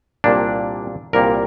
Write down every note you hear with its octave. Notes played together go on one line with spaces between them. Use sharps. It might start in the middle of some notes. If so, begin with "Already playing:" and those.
C2 A#2 G3 A#3 D4
C2 A#2 G3 A#3 A#4